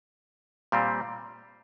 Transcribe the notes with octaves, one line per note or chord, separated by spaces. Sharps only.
A#2 G3 C4